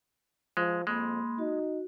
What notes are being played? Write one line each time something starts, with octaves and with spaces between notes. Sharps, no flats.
F3 G#3
F2 G#3 A#3 B5 C6
D#4 F#4